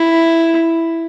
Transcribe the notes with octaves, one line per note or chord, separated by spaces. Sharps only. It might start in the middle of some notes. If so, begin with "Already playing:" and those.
Already playing: E4